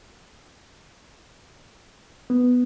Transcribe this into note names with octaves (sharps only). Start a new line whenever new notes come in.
B3